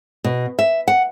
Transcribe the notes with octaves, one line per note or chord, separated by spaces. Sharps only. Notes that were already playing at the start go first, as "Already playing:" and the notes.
B2
E5
F#5